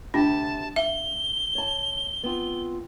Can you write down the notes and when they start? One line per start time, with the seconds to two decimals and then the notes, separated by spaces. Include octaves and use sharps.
0.14 D2 C3 D4 G4 A5
0.76 E5 F5 G7
1.55 C#5 A5
2.23 B3 C4 F4